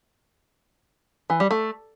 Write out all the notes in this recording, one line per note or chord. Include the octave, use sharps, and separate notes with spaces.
E3
G3
A3